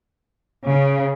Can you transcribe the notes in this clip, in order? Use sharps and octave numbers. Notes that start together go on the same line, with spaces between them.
C#3